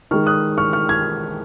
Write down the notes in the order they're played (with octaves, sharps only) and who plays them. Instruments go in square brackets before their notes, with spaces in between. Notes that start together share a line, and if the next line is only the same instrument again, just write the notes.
[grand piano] D#3 G#3 C#6 F6
D#6 F#6
C#6 F6
C#6 F6
F6 G#6